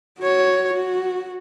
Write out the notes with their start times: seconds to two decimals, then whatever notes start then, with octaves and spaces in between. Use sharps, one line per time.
0.20 F#4 C#5
0.73 F#4